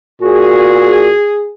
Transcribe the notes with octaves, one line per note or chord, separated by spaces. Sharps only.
A#2 F#4 G#4